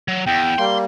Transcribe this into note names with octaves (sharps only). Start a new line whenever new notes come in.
F#3
E2 G5
G3 A#3 C6